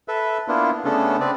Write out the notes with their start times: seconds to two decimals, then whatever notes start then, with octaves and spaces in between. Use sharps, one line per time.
0.08 A4 B4 E5
0.48 A#3 B3 D4 E4 F4
0.85 C#3 A3 B3 C#4 D4 A4
1.20 C4 B4 D5